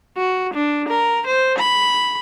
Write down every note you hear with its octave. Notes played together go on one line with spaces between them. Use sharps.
F#4
D4
A#4
C5
B5